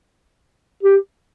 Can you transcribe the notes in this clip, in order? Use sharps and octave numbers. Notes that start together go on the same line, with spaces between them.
G4